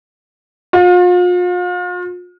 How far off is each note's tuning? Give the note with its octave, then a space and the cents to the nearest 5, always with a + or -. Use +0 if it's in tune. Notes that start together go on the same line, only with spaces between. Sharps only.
F4 +40